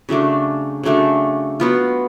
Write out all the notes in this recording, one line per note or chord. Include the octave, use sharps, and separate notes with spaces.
C#3 F#3 A3 D4
C#3 F#3 A3 D4
F#3 B3 F4